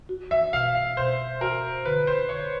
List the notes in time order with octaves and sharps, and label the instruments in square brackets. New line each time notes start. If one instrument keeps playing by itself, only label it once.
[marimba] F#4
[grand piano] E5
[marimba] B2 [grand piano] F5
[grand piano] F5
[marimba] B2 [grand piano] C5
[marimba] F#4 [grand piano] A#4
[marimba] D3 [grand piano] B4
[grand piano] C5
[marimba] D3 [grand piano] C#5